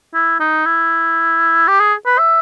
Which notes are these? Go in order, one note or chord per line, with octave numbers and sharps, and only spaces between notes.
E4
D#4
E4
G4
G#4
B4
E5